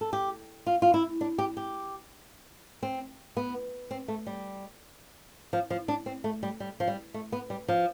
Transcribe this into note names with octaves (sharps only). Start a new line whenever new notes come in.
A4
G4
F4
F4
E4
D4
G4
G4
C4
B3
C4
A3
G3
F3
F3
D4
C4
A3
G3
G3
F3
G3
A3
B3
G3
F3